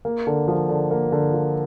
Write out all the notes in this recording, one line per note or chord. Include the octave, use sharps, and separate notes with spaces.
A#3
D3
F3
D3
A#3
D3
F3